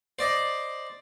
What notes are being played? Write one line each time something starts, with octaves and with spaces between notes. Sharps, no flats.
C5 D5 D#5